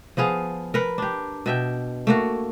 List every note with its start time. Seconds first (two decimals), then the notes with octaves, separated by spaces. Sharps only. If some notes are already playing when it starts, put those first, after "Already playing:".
0.17 F3 B3 G#4 F5
0.74 A#4 B4
0.98 D4 G4
1.46 B2 E5 G5
2.07 A3 A#3 F#4